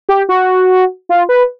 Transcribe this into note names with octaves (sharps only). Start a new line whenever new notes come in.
G4
F#4
F4
B4